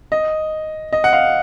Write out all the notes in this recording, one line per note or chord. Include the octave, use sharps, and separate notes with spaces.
D#5
D#5
F#5
F5